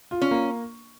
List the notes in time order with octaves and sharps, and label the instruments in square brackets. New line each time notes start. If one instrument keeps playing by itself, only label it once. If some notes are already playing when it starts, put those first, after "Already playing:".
[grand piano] F4
[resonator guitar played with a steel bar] C#4
[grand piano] A#3